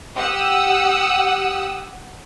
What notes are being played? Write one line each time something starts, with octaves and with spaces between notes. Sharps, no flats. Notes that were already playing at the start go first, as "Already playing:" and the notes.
G4 F#5 D#6 E6